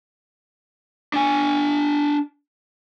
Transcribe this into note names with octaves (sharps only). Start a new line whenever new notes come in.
D4 G#5